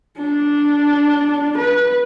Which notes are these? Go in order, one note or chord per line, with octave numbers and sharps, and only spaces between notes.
D4
B4